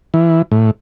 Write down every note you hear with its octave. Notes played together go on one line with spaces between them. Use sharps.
E3
A2